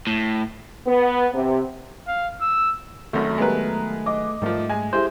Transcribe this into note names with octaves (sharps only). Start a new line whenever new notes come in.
A2
B3
C3
F5
E6
G#1 F#2 D#3 F#3 A3
G3 G#3 B3 A#4 B4
D#5 D6
G#2 D#3 F3 G3 A3
G#3 G#5
E4 G4 G#4 C5